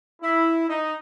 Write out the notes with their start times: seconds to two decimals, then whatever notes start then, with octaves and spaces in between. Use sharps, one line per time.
0.22 E4
0.69 D#4